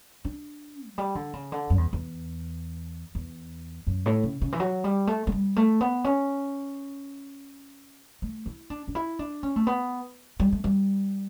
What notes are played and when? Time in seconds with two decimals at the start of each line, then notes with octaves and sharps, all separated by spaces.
0.25 D4
0.89 F#3
0.98 G3
1.15 D3
1.33 C#3
1.52 D3
1.70 F#2
1.78 E2
1.93 E2
3.15 E2
3.87 F#2
4.06 A2
4.23 C#3
4.41 C#3
4.53 E3
4.60 F#3
4.84 G3
5.07 A3
5.27 A3
5.32 G3
5.56 A3
5.81 B3
6.04 C#4
8.22 A3
8.46 E4
8.70 D4
8.88 D4
8.95 E4
9.19 D4
9.43 C#4
9.56 A3
9.67 B3
10.40 G3
10.52 A3
10.64 G3